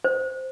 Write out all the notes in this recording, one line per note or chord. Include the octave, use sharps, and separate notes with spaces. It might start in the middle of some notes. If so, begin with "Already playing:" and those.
C5